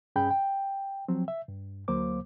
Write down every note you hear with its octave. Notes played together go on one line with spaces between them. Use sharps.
G2 C#4 G#4 G5 B5 G6
G5
F3 F#3 C4
E5
G2
D2 F#3 A#3 C5 D6